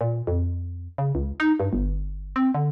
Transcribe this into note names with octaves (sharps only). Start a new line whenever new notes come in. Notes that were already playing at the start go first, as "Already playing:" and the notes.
A#2
F2
C#3
C#2
D#4
G2
G1
C4
D3